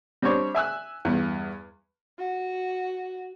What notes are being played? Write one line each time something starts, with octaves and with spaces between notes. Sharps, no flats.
G3 C4 D4 C#5
E5 G#5 E6 F#6
E2 G2
F#4